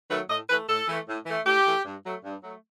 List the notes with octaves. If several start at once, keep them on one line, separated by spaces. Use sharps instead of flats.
D#3 F#3 A3 B4
A2 D#5
E3 A3 B4
A2 A4
E3 A3
A2
E3 A3
A2 G4
E3 A3
G2
F#3 A3
G2
F#3 A3